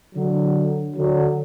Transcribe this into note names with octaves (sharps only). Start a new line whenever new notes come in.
D3 F#3
D3 F#3